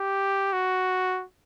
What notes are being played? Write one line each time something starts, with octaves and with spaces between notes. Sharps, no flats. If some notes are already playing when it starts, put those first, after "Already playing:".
Already playing: G4
F#4